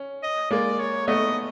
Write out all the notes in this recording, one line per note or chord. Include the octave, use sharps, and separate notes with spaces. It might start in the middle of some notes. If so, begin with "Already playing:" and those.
Already playing: C#4
D#5
G#3 A#3 D5
C#5
A3 B3 D#5